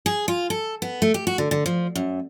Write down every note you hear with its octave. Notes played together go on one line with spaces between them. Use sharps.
G#4
F4
A4
B3
A3
G4
F#4
D3
D3
F3
F#2